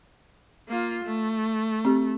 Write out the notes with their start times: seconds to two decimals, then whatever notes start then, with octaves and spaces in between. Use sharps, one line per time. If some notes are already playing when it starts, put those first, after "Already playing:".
0.68 A#3 F4
1.04 A3
1.85 C4 G4